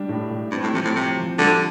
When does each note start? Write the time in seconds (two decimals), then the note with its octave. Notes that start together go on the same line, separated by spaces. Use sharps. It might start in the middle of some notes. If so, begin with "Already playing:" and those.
Already playing: G3 D4
0.09 A2
0.30 A2
0.51 G2 C4
0.63 A2
0.73 C3 F3
0.84 A2
0.95 C3 C4
1.17 F3
1.38 D3 G3